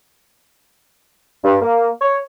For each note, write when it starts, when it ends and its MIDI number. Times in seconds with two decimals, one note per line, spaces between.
1.44 1.56 43
1.62 1.88 58
2.01 2.18 73